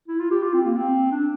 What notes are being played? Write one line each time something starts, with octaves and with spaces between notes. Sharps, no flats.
E4
F4
G4
F4
C4
A#3
C4
D4